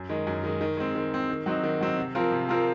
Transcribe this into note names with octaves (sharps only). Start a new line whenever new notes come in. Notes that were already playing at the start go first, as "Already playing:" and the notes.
Already playing: F#2
D#3 G#3
F#2
D#3 G#3
D#3
G#3 C4
D#3
G#3 C4
D#3
F#3 C4 D#4
D#3
F#3 C4 D#4
C3
F3 C4 F4 A#4
C3
F3 C4 F4 A#4